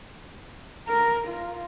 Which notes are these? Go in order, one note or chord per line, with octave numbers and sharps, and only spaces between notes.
A#4
F4